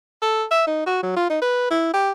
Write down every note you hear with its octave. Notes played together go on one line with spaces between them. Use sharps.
A4
E5
D#4
F#4
F#3
F4
D#4
B4
E4
G4